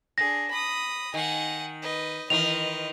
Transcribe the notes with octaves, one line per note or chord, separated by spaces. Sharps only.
D4 G#4 A#6
B5 D#6
D#3 F#5 G#5
B4 D#5
D#3 E3 A#4 B4 D#5 F7